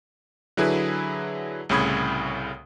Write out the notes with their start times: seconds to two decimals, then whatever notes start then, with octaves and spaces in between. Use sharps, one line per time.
0.57 D3 F#3 E4 G#4 B4
1.69 C2 A2 C#3 B5 D#6 G#6